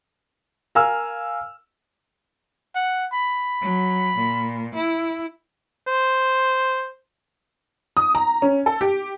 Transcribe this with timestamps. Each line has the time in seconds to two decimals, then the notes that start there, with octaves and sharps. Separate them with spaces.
0.75 A#4 F5 G#5 E6 F6
2.75 F#5
3.13 B5
3.61 F#3
4.16 A#2
4.74 E4
5.87 C5
7.97 D#6
8.15 A#5
8.42 C#4
8.66 A4
8.81 G4